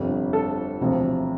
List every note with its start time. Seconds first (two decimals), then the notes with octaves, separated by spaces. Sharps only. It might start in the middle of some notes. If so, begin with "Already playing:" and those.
Already playing: G1 F2 C3 G3 D4
0.33 A4
0.80 E1 D2 C3 F3